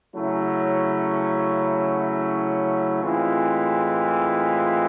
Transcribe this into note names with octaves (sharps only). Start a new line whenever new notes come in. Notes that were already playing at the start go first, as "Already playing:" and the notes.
C#3 F#3 A3 C#4 E4
A2 E3 G#3 C4 F4